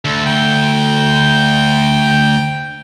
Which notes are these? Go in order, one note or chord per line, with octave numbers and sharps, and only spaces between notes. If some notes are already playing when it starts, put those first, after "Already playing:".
D2 A4
G5